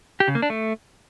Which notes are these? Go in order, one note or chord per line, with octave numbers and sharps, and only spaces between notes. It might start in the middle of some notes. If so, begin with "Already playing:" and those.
G4
C#3
A#3
D4
A3